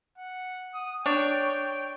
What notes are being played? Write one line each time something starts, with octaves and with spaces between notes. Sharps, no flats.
F#5
D#6
D4 C#5 G5